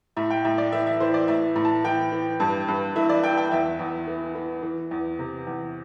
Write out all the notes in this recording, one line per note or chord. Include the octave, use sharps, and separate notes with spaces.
A2 E5
G5
A2 E5
D5
E3 E5
E5
E3 C5
D5
A2 E5
A2
A5
E3 G5
E3
G2
G2
E3 E5
D5
E3 G5
G5
E2 E5
E2
E3
E3
E3
E2
C3
E2